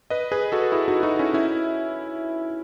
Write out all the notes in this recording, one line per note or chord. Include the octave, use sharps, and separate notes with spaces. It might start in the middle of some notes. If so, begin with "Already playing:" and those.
B4 D#5
G#4 B4
F#4 A4
E4 G#4
D#4 F#4
D#4 F#4
C#4 E4
C#4 E4